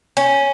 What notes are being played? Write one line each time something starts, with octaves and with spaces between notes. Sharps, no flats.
C#4